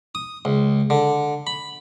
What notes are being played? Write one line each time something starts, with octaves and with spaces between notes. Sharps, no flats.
D#6
C#2
D3
B5